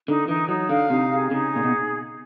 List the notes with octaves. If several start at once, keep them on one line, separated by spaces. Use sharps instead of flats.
D3 D#4
E3 D#4
F#3 D#4
D3 F5
C3 D#4
G#4
C#3 D#4
A#2 G#4
B2